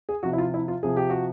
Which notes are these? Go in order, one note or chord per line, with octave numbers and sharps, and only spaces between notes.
G#4
C3 F3 F#4
E4
F4
E4
F4
C3 F3 G#4
G4
F#4